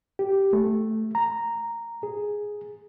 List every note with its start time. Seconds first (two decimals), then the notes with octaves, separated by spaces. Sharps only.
0.19 G4
0.53 A3
1.15 A#5
2.03 G#4